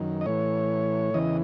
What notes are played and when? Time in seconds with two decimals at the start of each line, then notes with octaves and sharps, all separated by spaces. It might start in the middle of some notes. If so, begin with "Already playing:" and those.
Already playing: F#2 D#3
0.21 D#5
0.26 A2 E3 C#5
1.14 E2 C#3 E3 D#5